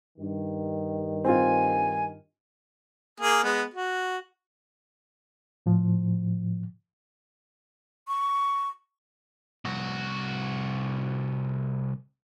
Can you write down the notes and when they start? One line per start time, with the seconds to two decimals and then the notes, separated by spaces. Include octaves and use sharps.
0.18 G2 D#3
1.25 C4 F4 G#5
3.20 A#3 G#4
3.44 G#3 B3
3.74 F#4
5.66 A2 F3
8.08 C#6
9.65 C2 F#4